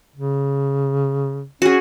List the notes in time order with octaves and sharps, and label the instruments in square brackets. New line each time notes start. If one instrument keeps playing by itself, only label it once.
[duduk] C#3
[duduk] C#4 [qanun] F#4 G#4